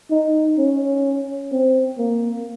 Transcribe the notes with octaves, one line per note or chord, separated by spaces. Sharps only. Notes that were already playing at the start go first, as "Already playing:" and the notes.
D#4
C#4
C4
A#3